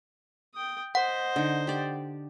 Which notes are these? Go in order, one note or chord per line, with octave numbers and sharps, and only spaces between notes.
G5 D#6
C5 D#5 F#5
D3 D#4
G4 D5